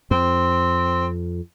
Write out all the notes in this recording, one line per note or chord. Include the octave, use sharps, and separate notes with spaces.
F2 C4